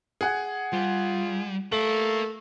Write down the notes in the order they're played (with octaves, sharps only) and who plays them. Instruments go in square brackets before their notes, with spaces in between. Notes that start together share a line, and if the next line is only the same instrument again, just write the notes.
[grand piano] G#4 F#5
[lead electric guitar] G3 [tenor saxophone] F4
[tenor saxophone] A3 [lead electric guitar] A#4 F5 [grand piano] F#7